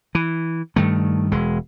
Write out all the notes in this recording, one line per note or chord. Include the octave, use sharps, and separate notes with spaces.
E3
G2 D#3 A3
E1 G#3